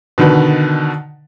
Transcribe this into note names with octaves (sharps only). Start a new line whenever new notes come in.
B2 D3 D#3 B4